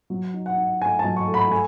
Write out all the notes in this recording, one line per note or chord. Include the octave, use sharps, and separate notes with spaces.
F#3
D#4
F#5
D#4
A3 G#5
F#3 A5
C#6
A3
B5
A3 G#5